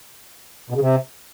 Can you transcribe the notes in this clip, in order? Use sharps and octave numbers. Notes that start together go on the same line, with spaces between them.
B2
C#3
C3